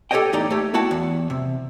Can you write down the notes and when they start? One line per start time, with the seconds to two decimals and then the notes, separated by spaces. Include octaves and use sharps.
0.11 G4 A4 A#4 C#5 D#5 G5
0.33 E2 A2 D#4 G4 D5 A#5
0.50 A3 G4 C#5
0.73 B3 E4 F#4 G5 A5
0.91 E2
1.30 C3